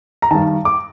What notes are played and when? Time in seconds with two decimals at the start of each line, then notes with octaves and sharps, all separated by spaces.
0.22 A#5
0.31 G2 D#3 A5
0.65 D6